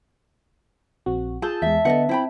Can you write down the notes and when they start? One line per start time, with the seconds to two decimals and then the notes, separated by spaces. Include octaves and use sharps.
1.06 A#1 C4 F#4
1.42 F4 G#4 A5 E6 G6
1.62 E2 G#3 E5
1.85 D3 B3 A4 D#5 F#5
2.09 C4 E4 G5 B5